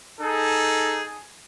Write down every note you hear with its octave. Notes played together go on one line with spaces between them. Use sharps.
D#4 G#4 A4